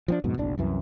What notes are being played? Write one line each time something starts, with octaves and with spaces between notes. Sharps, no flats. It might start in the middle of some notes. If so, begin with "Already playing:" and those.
F3 C4 D4
F2 G#2 B2
F#1 B1 D4
C2 F#2 E3